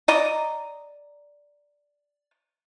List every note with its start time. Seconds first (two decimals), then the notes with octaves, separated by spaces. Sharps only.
0.08 D5 D#5 A#5